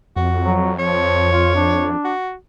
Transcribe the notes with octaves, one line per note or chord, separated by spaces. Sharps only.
F2 F#4
F#3
F3 C#5
F4
D4
F#4